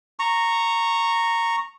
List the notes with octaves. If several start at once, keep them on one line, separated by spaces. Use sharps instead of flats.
A#5 C#6